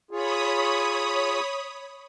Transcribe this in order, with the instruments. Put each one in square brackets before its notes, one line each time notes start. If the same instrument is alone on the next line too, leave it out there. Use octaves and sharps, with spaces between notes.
[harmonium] F4 G#4 [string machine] C#5 B5 D#6